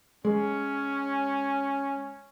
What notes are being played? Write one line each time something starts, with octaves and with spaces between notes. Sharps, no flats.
G#3 C#4